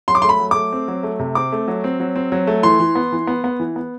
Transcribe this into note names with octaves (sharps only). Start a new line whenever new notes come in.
F#3 C6
D6
A3 C6
B5
F#3
A3 D6
C4
F#3
A3
C3
C4 D6
A3
F#3
C4
F#3
C4
F#3
A3
E3 C6
E3
B3
E3
B3
B3
E3
B3